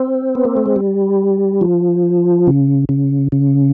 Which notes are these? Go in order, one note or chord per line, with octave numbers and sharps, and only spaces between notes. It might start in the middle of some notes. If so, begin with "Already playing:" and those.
Already playing: C4
B3
A#3
A3
G#3
G3
F3
C#3
C#3
C#3